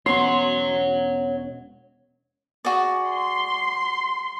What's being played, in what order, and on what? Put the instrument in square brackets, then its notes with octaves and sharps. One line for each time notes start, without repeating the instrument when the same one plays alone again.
[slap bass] E1 B3 C#4 [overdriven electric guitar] C#5 F#5 [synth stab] C6
[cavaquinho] F#4 G#4 D5
[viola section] C6